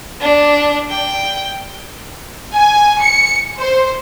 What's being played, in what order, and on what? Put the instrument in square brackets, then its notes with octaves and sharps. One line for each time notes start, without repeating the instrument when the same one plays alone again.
[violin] D4
G5
[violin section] G#5
C#7
C5